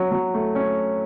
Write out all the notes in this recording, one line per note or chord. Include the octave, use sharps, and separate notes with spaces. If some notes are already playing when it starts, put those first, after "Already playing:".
Already playing: F#3 C#4
F#3
A3
C#4